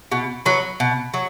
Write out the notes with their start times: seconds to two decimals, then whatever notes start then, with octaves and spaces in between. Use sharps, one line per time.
0.12 B2
0.46 F#3 B3
0.80 B2
1.14 F#3